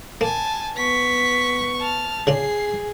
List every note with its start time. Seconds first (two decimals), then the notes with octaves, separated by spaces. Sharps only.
0.21 A#3 G#5 A5
0.76 B3 C#6 B6
1.80 A5 F6
2.27 C#3 D4 F4 G#4 C7